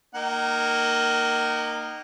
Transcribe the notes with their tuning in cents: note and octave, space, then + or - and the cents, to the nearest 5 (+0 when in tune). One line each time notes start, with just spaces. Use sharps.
A#3 +0 D#4 -25 G5 -45